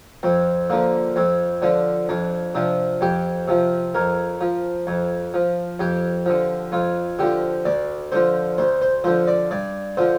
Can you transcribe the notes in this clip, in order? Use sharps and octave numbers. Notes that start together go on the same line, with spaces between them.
F2 C4
D3 F3 A#3
F2 C4
D3 F3 D4
F2 D4
C3 F3 D4
F2 G4
C3 F3
F2 A#4
F3
F2
F3
F2 G4
D3 F3
F2 F4
D3 F3 G4
D2 D5
D3 F3 C5
D2 C5
C5
D3 F3 C5
D5
G2 D5
D3 F3 C5